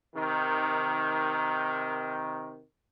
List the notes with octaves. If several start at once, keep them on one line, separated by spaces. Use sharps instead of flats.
C3 D#3